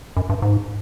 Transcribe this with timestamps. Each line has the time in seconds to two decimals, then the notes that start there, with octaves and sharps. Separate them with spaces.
0.17 F#2
0.29 G2
0.42 G#2